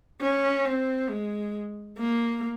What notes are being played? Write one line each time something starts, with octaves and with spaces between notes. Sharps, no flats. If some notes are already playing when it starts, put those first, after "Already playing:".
C#4
C4
G#3
A#3